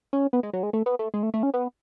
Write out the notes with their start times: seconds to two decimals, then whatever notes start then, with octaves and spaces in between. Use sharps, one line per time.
0.13 C#4
0.33 B3
0.43 G#3
0.53 F#3
0.63 G#3
0.73 A3
0.86 B3
0.99 A3
1.14 G#3
1.23 A3
1.34 A3
1.43 C#4
1.54 B3